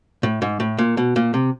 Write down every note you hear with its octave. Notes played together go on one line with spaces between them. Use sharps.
A2
G#2
A2
A#2
B2
A#2
C3